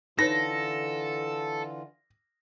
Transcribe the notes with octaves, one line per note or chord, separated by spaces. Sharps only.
D3 E3 D#4 F4 A4 B4 C#5 A#6